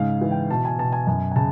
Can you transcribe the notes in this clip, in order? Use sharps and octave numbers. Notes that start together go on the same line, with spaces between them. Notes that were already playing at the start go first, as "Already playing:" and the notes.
Already playing: G#2 C#3 F5
E3
G5
B2 A5
G#5
B2 A5
G#5
F#2 G#5
G#5
C#3 A5